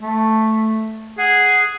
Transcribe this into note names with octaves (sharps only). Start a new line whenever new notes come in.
A3
G#4 F#5